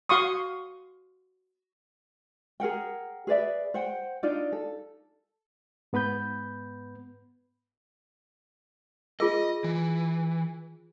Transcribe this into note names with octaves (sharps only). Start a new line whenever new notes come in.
F#4 F5 C6 C#6 D#6
G#4 A#4 F#5 G5
G#4 B4 D5 E5
C5 F#5 G5
D4 D#4 F4 D5
A4
G#2 B3 B4 B5 G6
F4 G#4 A#4 D#5
E3